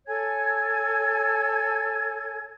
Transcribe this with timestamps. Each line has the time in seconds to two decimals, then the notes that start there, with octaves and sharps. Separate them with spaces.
0.06 A4 C#5 G#5 G#6